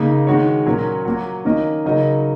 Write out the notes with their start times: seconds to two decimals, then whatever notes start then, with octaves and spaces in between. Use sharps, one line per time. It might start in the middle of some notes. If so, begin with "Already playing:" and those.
Already playing: C#3 A#3 D#4
0.27 D#3 G#3 F#4 C#5
0.66 A#2 F#3 C#4 A#4 C#5
1.05 F#3 A#3 F#4
1.45 D#3 A#3 C#4 A#4 D#5
1.85 C#3 F#3 D#4 A#4 D#5